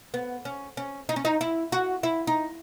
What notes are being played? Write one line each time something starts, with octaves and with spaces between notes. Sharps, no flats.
B3
C#4
C#4
D#4
C#4
D#4
E4
F#4
E4
D#4